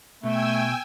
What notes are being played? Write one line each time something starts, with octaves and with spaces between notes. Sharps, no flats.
B2 A3 G5 G#5 E6